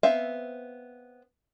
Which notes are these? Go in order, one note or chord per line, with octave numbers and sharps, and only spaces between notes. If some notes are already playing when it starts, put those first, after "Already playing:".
B3 C4 E5 F5